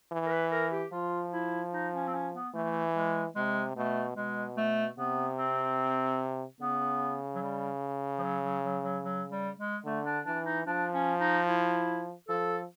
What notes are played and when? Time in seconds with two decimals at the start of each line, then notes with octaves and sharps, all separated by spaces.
0.12 E3
0.26 A#4
0.31 B4
0.52 A#4
0.72 G4
0.92 F3 F4
1.33 E4
1.73 D#4
1.94 C#4
2.08 C4
2.14 C#4
2.34 B3
2.54 E3 A3
2.95 G#3
3.35 C3 G#3
3.76 B2 A3
4.16 B2 G#3
4.57 A3
4.98 C3 B3
5.38 C4
6.61 C#3 B3
7.35 F#3
7.42 G3
8.18 F3
8.23 F#3
8.43 F#3
8.63 F#3
8.84 F#3
9.04 F#3
9.31 G3
9.58 G#3
9.85 D3 A3
10.05 D4
10.25 E3 D4
10.46 D#4
10.66 F3 D4
10.94 C#4
11.20 D#4
11.48 E4
12.29 F3 A4